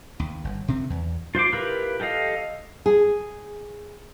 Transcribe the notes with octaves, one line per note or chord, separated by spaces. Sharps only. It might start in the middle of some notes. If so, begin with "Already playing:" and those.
D#2
G1
C3 D#3 C4
E2
F4 C5 C6 D6
E4 F4 G4 A#4 B4
G4 A4 D#5 F5
G#4